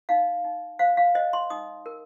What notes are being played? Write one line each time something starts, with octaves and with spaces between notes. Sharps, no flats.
D#4 F5
D#4
C5 F5
F5
C5 D#5
C6
D#4 D#6
A#4